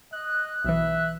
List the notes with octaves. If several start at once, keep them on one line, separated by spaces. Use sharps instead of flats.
D#5 F#6
B1 E3 E5